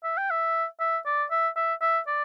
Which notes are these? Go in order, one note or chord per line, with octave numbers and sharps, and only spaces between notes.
E5
G5
E5
E5
D5
E5
E5
E5
D5